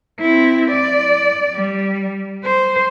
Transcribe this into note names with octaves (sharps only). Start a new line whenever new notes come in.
C4 E4
D5
G3
C5